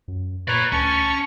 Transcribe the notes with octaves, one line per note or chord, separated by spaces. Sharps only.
F#2
A#2 B4 C#5 D5 A#5
D2 C#4 A5 C#6